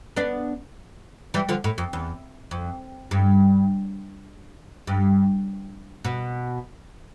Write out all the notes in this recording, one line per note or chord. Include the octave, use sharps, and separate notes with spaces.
B3 D4
E3 G3
D3 F3
A2
F2
E2
F2
G2
G2
B2